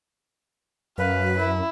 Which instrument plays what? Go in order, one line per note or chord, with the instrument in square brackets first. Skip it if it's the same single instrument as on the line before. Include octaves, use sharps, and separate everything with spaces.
[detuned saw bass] F#2 [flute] B4 [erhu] F5
[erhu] E4